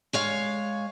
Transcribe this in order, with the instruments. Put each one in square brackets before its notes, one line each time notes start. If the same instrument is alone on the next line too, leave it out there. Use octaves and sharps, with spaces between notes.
[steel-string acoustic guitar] G#3 C#5 F5